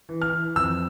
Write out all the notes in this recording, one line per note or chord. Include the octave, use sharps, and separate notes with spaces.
E3
F6
E3
F2 E6